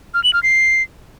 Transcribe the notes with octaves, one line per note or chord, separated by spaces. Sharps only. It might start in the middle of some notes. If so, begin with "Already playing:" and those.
F6
F#7
F6
C7